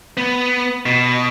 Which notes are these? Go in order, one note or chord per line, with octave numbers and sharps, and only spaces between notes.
B3
B2